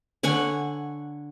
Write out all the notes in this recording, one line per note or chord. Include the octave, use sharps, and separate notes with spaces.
D3 C#5 F#5 G#5